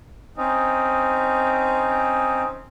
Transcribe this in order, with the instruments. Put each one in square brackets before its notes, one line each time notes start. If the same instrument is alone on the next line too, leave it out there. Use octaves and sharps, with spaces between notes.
[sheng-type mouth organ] C4 C#4 D#4